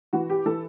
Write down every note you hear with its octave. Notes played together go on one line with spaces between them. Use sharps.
E3 F#4
G4
E3 A4